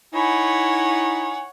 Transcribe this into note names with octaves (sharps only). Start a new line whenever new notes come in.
D#4 E4 C#5 F#5 G#5